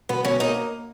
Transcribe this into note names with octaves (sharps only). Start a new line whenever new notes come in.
B2 B3
B2 C#4
A#3 D#4